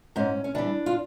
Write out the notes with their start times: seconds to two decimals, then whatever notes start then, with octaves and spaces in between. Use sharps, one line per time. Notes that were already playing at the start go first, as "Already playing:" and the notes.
0.16 G#2 C#4
0.44 C#4
0.55 E3 G3 D4
0.86 F4